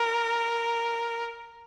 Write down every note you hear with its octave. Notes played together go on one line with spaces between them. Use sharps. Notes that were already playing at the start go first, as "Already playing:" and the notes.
Already playing: A#4